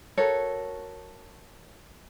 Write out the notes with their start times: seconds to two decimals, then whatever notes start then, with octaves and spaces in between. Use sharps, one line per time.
0.17 F#4 A4 A#4 C#5